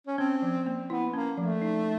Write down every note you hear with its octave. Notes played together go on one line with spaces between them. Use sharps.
C#4
C4 C#4
F3
A#3
B3 E4
A#3 C#4
F3 A3
D#4